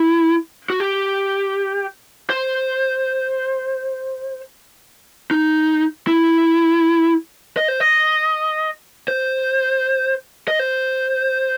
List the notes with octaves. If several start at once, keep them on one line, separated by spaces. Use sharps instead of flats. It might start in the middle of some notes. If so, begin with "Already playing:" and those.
Already playing: E4
F#4
G4
C5
D#4
E4
D#5
C5
D#5
C5
D#5
C5